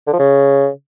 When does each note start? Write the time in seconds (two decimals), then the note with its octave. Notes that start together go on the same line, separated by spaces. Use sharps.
0.07 D3
0.13 F3
0.19 C#3